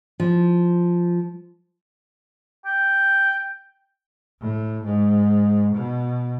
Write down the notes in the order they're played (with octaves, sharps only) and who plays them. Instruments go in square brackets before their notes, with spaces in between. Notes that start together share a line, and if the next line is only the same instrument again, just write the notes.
[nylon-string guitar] F3
[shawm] G5
[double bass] A2
G#2
B2